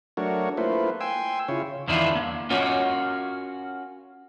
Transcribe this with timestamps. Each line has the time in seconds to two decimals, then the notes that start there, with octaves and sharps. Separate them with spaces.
0.17 F#3 A3 D4 F#4 A#4 C#5
0.57 A3 A#3 E4 F4 B4 C5
1.01 G5 G#5 C6 E6
1.48 C#3 E4 F4 C#5
1.88 E2 D#3 D4 E4 F4 F5
2.15 A#3
2.50 C#4 F4 F#4 A#4 C#5